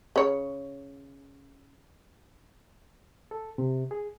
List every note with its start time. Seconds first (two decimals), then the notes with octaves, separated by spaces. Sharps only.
0.16 C#3 C#5
3.31 A4
3.58 C3
3.91 G#4